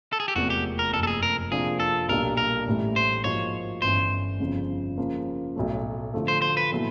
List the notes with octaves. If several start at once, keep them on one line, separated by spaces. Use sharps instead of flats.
A4
G#4
G4
F1 E2 C3 F3 A#3 F#4
G4
A#4
F#1 F2 C3 A4
A4
G#4
A#4
C3 F3 A#3 D4 F4 G#4
A4
B1 A#2 G3 A#3 D4 A#4
A#4
A1 A2 E3 G3
C5
G#2 F3 A#3 D#4 F#4 C#5
G1 G2 E3 A3 C#4 C5
G1 F2 C#3 F3
C#3 F3 A#3
B1 A2 F#3 A3
D3 F3 A3
C5
C5
B4
A#2 F#3 B3 E4 A4